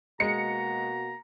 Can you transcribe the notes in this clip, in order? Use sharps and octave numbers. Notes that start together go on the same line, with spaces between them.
B2 G#3 A#3 F#4 A#5 C#7